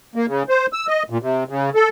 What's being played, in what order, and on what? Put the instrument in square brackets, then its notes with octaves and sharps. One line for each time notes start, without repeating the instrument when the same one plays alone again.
[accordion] A#3
C#3
C5
E6
D#5
A#2
C3
C#3
A4